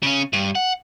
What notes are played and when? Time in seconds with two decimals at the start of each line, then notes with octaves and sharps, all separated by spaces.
0.03 C#3 C#4
0.33 G2
0.55 F#5